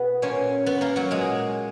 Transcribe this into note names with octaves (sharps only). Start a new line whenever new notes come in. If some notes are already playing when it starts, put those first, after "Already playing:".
Already playing: B2 B3 G#4 B4
A#2 C#4 C#5
B3 B4
A#3 A#4
F#3 F#4
A#2 G#3 G#4